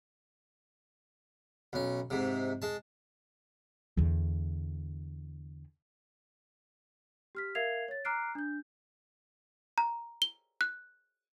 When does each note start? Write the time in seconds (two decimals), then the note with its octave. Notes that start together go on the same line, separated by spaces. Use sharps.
1.73 B1 C#4
2.10 G#2 C3
2.62 G#3 A5
3.97 E2 D3
7.35 G4 F6 B6
7.55 A#4 E5 F5 G#6 C7 F7
7.88 C#5 A6
8.05 A#5 D6 F6 F#6 C7 D7
8.35 D4 G6
9.78 A#5
10.22 G7
10.61 F#6